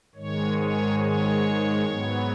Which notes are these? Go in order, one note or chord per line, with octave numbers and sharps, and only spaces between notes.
G#2 D#3 G#3 C#5
C#5
C#5
G#2 F#3 B3